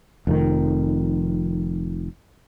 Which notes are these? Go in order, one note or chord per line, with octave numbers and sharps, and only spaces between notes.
F1 F2 A2 D#3